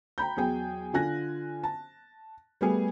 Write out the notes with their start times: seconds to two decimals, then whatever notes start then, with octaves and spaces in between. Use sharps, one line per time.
0.18 G5 A#5 B5 G6
0.37 E2 F#3 G#4 G5
0.93 D3 F4 G#5 F#6 A#6
1.64 A5
2.61 G3 A3 B3 G#4